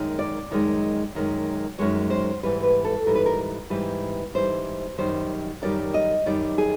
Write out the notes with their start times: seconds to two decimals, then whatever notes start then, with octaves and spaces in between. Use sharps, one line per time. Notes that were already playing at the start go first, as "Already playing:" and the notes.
Already playing: F#2 D#3 G#3
0.19 D5
0.51 F#2 D#3 G#3
1.15 F#2 D#3 G#3
1.79 F#2 D#3 G#3 C#5
2.10 C5
2.43 G#2 E3 G3 B4
2.63 B4
2.85 A4
3.06 G#2 E3 G3 A#4
3.15 B4
3.26 A#4
3.70 G#2 E3 G3 B4
4.34 G#2 E3 G3 C5
4.98 F#2 D#3 G3 C5
5.62 F#2 D#3 G3 D5
5.94 D#5
6.26 F#2 D#3 G3 D5
6.58 G#4